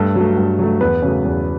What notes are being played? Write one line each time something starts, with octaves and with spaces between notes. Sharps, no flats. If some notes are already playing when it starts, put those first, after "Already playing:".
Already playing: G2 A3 A4
F#3 A3
G2
F#3 A3
E2 B3 B4
C#3 F#3 A3
E2